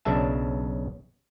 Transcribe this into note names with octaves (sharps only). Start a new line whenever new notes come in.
B1 C#3 D4 E5 A5